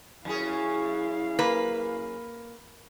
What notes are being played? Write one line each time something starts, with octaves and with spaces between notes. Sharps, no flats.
F#2 C#4 E4 G#4 F5
A#3 B4